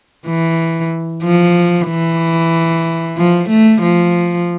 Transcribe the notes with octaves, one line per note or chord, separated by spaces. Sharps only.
E3
F3
E3
F3
A3
F3